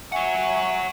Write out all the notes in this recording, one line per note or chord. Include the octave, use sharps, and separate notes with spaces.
C#5 E5 F#5 G#5 C#6